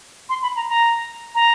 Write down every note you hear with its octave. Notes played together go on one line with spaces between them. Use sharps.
C6
B5
A#5
A#5
A#5